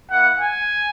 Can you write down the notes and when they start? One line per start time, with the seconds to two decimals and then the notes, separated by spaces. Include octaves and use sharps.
0.11 A#3 E4 F#5
0.39 G#5